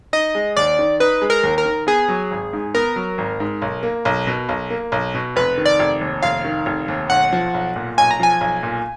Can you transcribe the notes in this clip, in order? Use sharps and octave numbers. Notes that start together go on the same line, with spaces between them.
D#4 D#5
G#3
D#2 D5
D#3
D#4 B4
G#3
A#4
D#2
A#4
D#3
B3 G#4
F#3
G#1
G#2
B3 A#4
F#3
G#1
G#2
B1
A#3
B1
B2
B1
A#3
B1
B2
F1 B4
D#3
D5
F1
D#2
F1 F5
D#3
F1
D#2
B1 F#5
F3
B1
A#2
B1 G#5
A#5
F3 G#5
B1
A#2